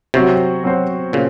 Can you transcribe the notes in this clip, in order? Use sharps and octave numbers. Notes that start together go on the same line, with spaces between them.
C3 F#3 C4 F#4 C5
F#3 C4 F#4 C5
A#2 C#3 C5